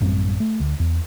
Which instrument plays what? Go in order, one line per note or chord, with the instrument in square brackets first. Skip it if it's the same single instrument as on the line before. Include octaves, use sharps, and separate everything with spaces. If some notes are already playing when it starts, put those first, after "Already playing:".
[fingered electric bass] A1 F#2 G3 C4
A3
D2
E2